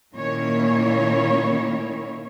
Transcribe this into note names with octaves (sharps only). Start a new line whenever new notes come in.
A#2 D#3 A#3 C#4 E4 C#5